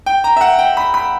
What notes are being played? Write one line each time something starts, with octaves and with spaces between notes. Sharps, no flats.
G5
A#5
E5
F#5
G5
B5
B5